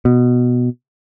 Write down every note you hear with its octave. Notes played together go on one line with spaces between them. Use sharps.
B2